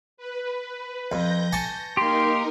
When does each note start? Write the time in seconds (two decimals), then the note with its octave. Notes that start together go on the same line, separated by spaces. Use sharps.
0.17 B4
1.12 F2 G6 A#6
1.53 G#5 A5 C#6
1.97 A#3 D#4 G4 A#4 C6